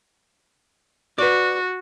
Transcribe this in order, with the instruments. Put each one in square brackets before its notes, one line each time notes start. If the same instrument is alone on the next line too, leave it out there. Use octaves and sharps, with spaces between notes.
[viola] F#4 [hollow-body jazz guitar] B4 D5